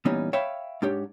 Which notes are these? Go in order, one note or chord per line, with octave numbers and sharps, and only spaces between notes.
A#2 E3 G3 B3 C#4 D#4
C#5 E5 F5 G5 B5
G#2 D4 G4 C#5